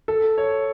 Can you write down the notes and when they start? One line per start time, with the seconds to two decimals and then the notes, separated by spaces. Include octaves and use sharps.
0.08 A4
0.38 C#5